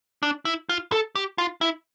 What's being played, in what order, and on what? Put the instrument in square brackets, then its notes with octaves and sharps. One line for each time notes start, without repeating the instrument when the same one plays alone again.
[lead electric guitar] D4
E4
F4
A4
G4
F4
E4